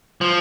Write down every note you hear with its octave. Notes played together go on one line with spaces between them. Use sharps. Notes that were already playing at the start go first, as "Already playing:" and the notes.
F3